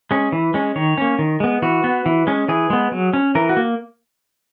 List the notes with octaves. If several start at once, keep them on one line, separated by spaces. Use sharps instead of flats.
G#3 C#4
E3
G#3 C#4
D#3 C#5
A#3 C#4
D#3
G#3 B3
E3 F#4
B3
E3
G#3 C#4
E3 G#4
G#3 B3
F#3
C#4
E3 A#4
F#4
A#3